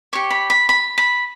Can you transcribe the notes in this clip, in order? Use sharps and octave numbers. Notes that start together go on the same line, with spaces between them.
G4 C#5 C#6
B5
B5
B5
B5